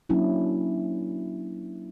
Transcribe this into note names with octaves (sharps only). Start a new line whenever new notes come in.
F#3 A#3 C#4 D4 E4